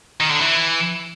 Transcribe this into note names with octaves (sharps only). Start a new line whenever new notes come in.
D#3
D3
E3